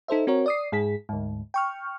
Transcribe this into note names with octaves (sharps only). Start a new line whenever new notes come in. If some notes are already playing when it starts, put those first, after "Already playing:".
D#4 A4 C5 E5
C4 F#4 A#4 C#5
D5 D#6 C7
G#2 G#4 B6
D2 G#2
G5 C#6 F6